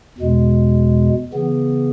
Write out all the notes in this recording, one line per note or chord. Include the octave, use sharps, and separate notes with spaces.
E2 B2 G#3
C#3 E3 B3